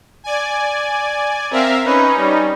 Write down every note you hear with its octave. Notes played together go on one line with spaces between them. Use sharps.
D5 G#5
C4 A#4 E5 F5
C#4 D#4 B4
G3